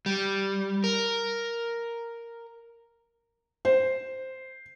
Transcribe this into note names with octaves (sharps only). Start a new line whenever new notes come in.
G3
A#4
C5